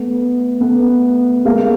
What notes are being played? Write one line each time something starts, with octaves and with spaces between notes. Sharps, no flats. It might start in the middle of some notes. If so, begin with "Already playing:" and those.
Already playing: A3 B3
A3 B3
G#3 A#3